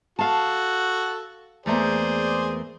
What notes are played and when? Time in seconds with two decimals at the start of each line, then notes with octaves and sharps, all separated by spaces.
0.19 F#4 A4 F5 A5
1.66 E2 A3 A#3 G#4 C5 D5